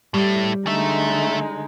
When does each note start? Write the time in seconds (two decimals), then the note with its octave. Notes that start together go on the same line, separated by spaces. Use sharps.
0.14 A2 G3 A3
0.67 D3 G#3 A3 D#4 E5